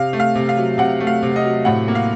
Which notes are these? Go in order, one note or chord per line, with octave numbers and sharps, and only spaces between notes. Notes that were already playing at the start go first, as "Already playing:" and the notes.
Already playing: C3 F5
A3
F5
C3
F5
F#3
C3 F#5
A3
F5
C3
D#5
F#3
A2 F#5
A#3
F5